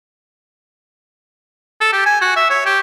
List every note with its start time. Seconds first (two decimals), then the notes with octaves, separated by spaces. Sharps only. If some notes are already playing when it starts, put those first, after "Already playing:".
1.81 A4
1.93 G4
2.06 G#5
2.22 F#4
2.37 E5
2.50 C#5
2.66 G4